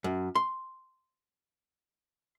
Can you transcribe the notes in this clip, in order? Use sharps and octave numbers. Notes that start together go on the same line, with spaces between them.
F#2
C6